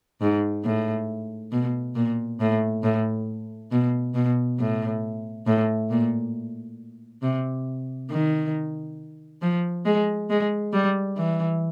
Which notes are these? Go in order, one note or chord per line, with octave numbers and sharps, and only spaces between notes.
G#2
A2
B2
A#2
A2
A2
B2
B2
A2
A2
A#2
C3
D#3
F3
G#3
G#3
G3
E3